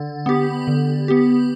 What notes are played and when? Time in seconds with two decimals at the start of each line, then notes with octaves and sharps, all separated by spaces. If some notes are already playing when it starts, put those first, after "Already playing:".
Already playing: D3
0.26 B3 G4
0.67 D3
1.08 B3 G4